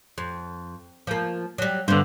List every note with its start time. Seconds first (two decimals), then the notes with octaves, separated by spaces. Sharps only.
0.18 F2
1.07 F3 A#3
1.58 F#3 G3
1.88 G2 D3 B3 C4